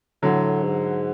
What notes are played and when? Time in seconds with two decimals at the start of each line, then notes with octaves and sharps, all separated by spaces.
0.23 A2 D3 F#3
0.64 G#2